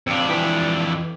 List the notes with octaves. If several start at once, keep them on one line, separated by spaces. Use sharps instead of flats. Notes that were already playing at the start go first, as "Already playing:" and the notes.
F2 C4 D4 F5
E3 E4 G5 B6